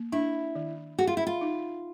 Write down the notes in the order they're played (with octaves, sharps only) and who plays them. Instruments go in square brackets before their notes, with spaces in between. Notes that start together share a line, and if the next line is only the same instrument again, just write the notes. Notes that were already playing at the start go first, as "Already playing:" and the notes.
Already playing: [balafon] A#3
[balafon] D4 [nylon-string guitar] E4
[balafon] D#3
[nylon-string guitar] F#4 [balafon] G#4
[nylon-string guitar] F4
E4
F4
[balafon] D#4